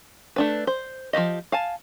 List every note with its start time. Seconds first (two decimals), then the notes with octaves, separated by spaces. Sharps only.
0.36 A3 D4 B4
0.67 C5
1.13 F3 A#3 G4 D#5
1.52 F5 G#5 A5